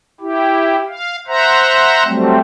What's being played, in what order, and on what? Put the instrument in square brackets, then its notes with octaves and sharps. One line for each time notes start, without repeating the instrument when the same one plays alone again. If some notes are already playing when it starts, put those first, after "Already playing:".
[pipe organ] E4 G4
F5
C5 E5 F#5 A#5
F#3 G3 A3 C4